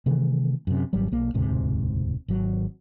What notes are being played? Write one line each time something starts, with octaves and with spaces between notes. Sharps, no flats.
C3 D#3 E3 A3
F#2 C3
G#1 F#3 G3
B1 A#3
E1 D2 G#2 C3
G#1 F#3